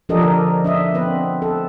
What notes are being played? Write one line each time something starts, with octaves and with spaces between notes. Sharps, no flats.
F3 D4 G4 A4 A#4 D#5
D3 A4 A#4
D4 D#5 E5
B3 C4 B4
A4